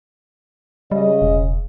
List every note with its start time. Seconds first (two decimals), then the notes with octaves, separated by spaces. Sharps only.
0.92 C#3 G3 D#5
1.22 E1